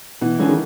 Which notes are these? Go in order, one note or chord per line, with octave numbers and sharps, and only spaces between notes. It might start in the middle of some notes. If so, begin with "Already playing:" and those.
B2 E3
D3 G#3 C#4 F4 G#4
D#3